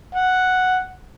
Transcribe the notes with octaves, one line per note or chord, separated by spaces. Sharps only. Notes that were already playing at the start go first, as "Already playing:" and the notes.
F#5